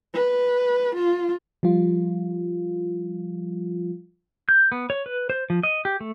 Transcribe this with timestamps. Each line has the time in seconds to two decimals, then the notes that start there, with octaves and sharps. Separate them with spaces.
0.14 B4
0.95 F4
1.63 F3 G3 F4
4.49 G6
4.72 B3
4.90 C#5
5.06 B4
5.30 C5
5.50 F3
5.63 D#5
5.85 G4
6.01 A3